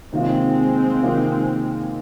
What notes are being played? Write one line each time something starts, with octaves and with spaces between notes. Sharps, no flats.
C3 D#3 G#3 A#3 C4 F4
C3 D#3 A#3 F4